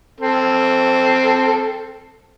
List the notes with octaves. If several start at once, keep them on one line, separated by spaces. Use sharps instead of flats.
C4 A4